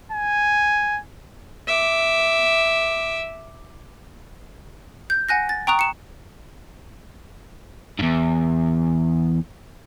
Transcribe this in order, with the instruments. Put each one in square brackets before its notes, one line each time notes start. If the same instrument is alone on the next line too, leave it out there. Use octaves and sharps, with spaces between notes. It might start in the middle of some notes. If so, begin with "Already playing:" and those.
[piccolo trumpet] G#5
[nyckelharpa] E5 D6
[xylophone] G6
F#5 G#5 F#6 A#6
A6
G5 A#5 C#6 D#6 F#6 F7
C#7 E7
[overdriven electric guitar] E2 G2